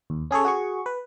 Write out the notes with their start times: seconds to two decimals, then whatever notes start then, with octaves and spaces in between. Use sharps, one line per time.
0.10 D#2
0.31 C#4 G#4 A4 C#5
0.45 F#4 G#4 C#6
0.86 B4